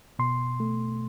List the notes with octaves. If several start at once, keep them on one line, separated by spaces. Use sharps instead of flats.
B2 C6
A3